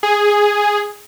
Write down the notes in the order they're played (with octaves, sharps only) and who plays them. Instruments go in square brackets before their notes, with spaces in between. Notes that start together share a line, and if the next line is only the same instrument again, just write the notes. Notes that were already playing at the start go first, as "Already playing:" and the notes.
[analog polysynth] G#4